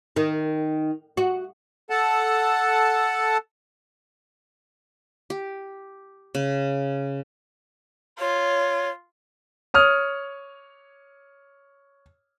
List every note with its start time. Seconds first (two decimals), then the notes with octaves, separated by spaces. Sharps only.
0.16 D#3
1.17 F#4
1.90 A4 F#5 A5
5.30 G4
6.35 C#3
8.19 F4 C#5
9.74 C#5 D#6 F6